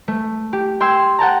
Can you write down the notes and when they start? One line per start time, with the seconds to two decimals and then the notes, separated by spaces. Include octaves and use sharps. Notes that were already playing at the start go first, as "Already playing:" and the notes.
0.08 A3
0.53 G4
0.80 G5 C6 E6 G#6
1.19 F#5 G5 A5 A#5